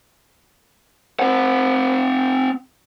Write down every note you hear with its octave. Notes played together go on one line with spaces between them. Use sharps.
C4 F#5